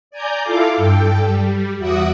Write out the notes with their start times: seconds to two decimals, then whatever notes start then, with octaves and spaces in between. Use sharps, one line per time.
0.11 D5 G#5 A#5 G6
0.42 E4 F4 A4 F5 D6
0.75 G2 A4 G5
1.21 G3
1.78 E2 F#4 E5 F#5 D6 D#6